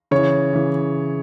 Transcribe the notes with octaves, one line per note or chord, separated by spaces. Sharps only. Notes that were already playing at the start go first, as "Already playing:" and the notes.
C#3 E3 C#5
C#3 E3